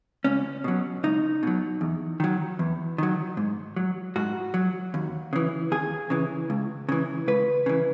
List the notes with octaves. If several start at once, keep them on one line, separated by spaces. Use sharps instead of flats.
C#2 C#4
B2 F#3
C#2 D#4
B2 F#3
E2
D#3 F#3
E2
D#3 F#3
G#2
F#3
G#2 F#4
F#3
D#2
C#3 E3
D#2 G#4
C#3 E3
C#2
C#3 E3
C#2 B4
C#3 E3